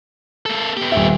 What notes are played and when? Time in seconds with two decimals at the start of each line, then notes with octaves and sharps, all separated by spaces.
0.46 A#3 A4
0.77 B3 G4
0.92 D#1 E5